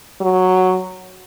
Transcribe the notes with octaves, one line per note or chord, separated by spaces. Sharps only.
F#3